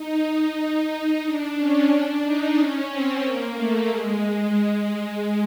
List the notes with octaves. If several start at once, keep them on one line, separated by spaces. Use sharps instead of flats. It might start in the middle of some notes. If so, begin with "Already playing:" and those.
Already playing: D#4
D#4
D4
C#4
D4
D#4
C#4
C4
A#3
A3
G#3